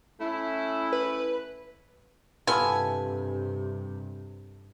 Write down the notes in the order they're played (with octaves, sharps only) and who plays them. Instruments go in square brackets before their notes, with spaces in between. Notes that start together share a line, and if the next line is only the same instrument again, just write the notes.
[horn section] A3 C#4 E4
[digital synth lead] B4
[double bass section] G2 C3 [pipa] B3 E4 F4 [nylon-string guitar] A4 B4 [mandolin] G#5